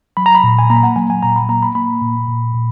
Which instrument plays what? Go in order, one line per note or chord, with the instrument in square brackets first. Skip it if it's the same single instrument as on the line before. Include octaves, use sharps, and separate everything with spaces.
[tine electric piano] F#3 B5
A#5
B5
A#2
G#5
A#3 A#5
F#5
F#3 G#5
G#5
A#2 A#5
B5
A#3 A#5
B5
A#3 B5
A#2
A#2
A#2